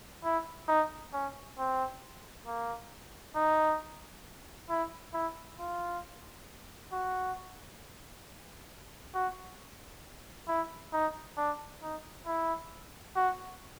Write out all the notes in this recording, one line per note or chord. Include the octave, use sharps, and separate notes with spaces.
E4
D#4
C#4
C4
A#3
D#4
E4
E4
F4
F#4
F#4
E4
D#4
D4
D#4
E4
F#4